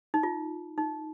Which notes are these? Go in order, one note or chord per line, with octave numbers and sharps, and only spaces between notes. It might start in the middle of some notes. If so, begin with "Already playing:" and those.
D#4
F4
D#4